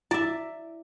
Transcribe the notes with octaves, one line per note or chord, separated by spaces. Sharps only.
E4 D5 E5